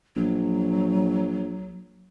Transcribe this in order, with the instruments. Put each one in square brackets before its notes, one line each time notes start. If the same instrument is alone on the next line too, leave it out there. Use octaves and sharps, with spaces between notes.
[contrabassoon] A#1 [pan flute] F#3